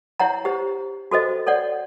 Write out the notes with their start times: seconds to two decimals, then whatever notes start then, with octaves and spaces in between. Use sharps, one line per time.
0.20 E4 C#5 F#5 A#5
0.45 G4 C5
1.12 F#4 A4 C5 D#5
1.47 A4 C#5 D5 F#5